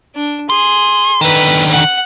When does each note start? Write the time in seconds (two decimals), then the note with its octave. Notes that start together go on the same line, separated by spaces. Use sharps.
0.15 D4
0.50 G#4 C6
1.21 D3 D#3 B4
1.71 F#5